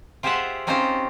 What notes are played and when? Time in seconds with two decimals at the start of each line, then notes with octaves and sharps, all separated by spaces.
0.23 F4 G4 G#4 C5 E5 F#5
0.67 C4 C#4 D#4 F4 G4 C5